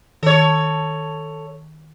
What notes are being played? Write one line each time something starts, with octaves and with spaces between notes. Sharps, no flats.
D#3 A4 C#5